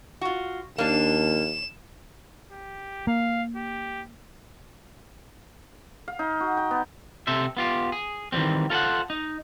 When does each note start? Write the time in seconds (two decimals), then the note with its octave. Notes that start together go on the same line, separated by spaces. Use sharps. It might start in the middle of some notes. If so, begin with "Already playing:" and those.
0.21 F4 F#4
0.78 D#2 A#3 D4 E7
2.51 G4
3.07 A#3 F5
3.56 G4
6.08 F5
6.19 D#4
6.40 F#4
6.57 G5
6.71 B3
7.27 C3 A4 C5 E5
7.57 B3 F4 G4
7.92 G#4
8.32 D#3 E3 G3 G#3 C4
8.70 F4 A4 B4 C5 F#5
9.10 D#4